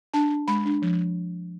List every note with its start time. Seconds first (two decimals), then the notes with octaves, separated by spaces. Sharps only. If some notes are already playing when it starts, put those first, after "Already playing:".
0.14 D4 A5
0.30 D4
0.48 G#3 B5
0.65 D4
0.82 F3